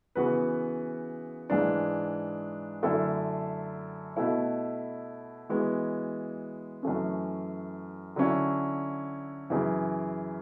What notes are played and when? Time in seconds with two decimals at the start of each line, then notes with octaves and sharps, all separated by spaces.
0.15 C#3 E3 B3 F#4 B4
1.50 G#2 E3 G#3 D4
2.83 F#2 D3 A3 E4 A4
4.17 B2 A3 E4
5.50 E3 G#3 B3 F#4
6.83 F#2 E3 A3 C#4
8.16 D3 F#3 C#4 E4
9.50 F#2 C#3 E3